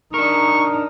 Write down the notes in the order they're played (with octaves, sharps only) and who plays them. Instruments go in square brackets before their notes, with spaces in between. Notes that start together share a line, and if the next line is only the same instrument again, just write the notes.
[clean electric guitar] D4 A#4 [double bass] D#4 [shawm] C#6